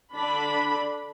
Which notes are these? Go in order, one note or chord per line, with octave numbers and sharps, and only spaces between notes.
D3 D4 B5